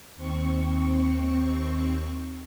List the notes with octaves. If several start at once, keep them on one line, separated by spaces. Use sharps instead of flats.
D#2 C4 C#6